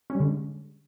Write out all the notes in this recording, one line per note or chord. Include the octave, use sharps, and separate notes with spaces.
C#4
G3
D3
G#3